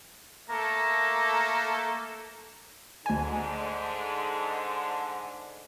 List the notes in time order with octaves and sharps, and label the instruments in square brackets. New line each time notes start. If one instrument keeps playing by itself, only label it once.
[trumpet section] A3 A#3 A4 [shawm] A#5
[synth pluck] D2 G#5 [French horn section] G#2 D3